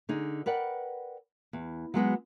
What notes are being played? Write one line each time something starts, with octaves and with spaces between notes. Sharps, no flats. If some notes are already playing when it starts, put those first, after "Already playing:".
D3 D#4 G#4
A#4 B4 D5 F#5 G5
E2
F#3 G#3 B3 F#4